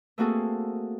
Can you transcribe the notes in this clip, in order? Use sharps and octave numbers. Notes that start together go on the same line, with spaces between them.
A3 A#3 C4 F#4 G#4 A4